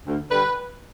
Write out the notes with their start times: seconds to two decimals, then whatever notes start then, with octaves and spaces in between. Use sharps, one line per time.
0.07 D2
0.31 D3 G3 B4